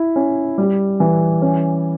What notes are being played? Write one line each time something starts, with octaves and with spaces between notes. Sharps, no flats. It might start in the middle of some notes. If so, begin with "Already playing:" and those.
Already playing: E4
C#4
G3
E3
C#4